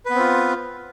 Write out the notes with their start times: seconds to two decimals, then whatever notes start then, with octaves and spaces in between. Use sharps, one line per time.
0.06 B4
0.10 B3
0.15 C4
0.19 F4